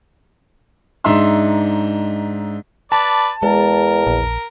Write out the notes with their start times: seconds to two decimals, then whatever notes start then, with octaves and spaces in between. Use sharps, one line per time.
1.04 G#2 D4 D#4 E5 C6 E6
2.92 B4 D5 A5
3.43 E2 G#3 A#4
4.07 A#1